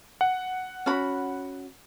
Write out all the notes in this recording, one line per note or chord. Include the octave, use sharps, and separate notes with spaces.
F#5
C#4 F#4 B5